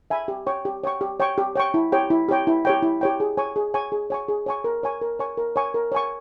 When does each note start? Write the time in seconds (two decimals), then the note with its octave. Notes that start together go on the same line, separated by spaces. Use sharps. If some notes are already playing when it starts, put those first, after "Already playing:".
0.10 E5 G#5 B5
0.28 G4
0.47 C#5 G5 C#6
0.65 G4
0.84 C#5 G5 C#6
1.01 G4
1.20 C#5 G5 C#6
1.38 G4
1.56 C#5 G5 C#6
1.74 E4
1.92 G4 C#5 G5
2.10 E4
2.29 G4 C#5 G5
2.47 E4
2.65 G4 C#5 G5
2.83 E4
3.01 G4 C#5 G5
3.20 G#4
3.37 C#5 G#5 C#6
3.56 G#4
3.74 C#5 G#5 C#6
3.92 G#4
4.10 C#5 G#5 C#6
4.28 G#4
4.46 C#5 G#5 C#6
4.64 A#4
4.83 C#5 G#5 C#6
5.01 A#4
5.19 C#5 G#5 C#6
5.37 A#4
5.56 C#5 G#5 C#6
5.74 A#4
5.92 C#5 G#5 C#6